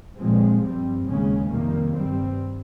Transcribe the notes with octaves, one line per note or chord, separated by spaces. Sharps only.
A#2 F3 G#3 C4
G2 G3 C4
D#2 C#3 G#3 C#4
F2 C3 D#3 G3 A#3
G2 G3 C4